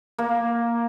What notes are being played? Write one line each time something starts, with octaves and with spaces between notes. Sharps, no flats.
A#3